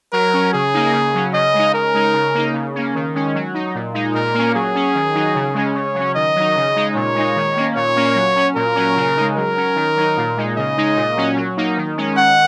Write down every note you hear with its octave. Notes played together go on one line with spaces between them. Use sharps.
F#3 A#4
C#4
C#3 G#4
A#3 D#4
C#3
F#3 C#4
C#3 D#5
G#3 D#4
C#3 A#4
G#3 D#4
C#3
A#3 D#4
C#3
A#3 C#4
D#3
G#3 C#4
F#3
D#4
A#2
G#3 D#4
A#2 A#4
A#3 C#4
F#3 G#4
C#4
D#3
F#3 D#4
C#3
G#3 C#4
C#3 C#5
F#3 C#4
D#3 D#5
F#3 D#4
C#3
G#3 D#4
A#2 C#5
G#3 D#4
D#3
A#3 C#4
A#2 C#5
A#3 C#4
F#3
C#4
A#2 A#4
F#3 C#4
C#3
G#3 D#4
F#3 A#4
C#4
D#3
F#3 D#4
A#2
G#3 D#4
C#3 D#5
G#3 D#4
A#2
F#3 C#4
F#3
A#3 D#4
D#3
G#3 C#4
D#3 F#5